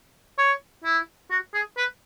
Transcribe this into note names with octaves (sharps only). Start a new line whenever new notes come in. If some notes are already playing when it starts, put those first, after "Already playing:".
C#5
E4
F#4
G#4
B4